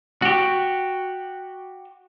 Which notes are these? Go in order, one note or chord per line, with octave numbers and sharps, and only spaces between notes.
F#4 G4